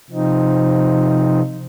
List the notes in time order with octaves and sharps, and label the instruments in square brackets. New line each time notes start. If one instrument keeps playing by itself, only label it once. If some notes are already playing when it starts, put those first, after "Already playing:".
[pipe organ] C3 F3 C4 D#4